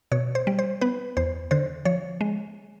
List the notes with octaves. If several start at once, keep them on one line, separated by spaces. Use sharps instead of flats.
B2 C#5
C5
G3
C5
B3 B4
E2 C5
D3 C5
F3 C#5
G#3